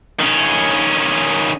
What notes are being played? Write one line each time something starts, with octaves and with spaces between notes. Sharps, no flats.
D#3 C#4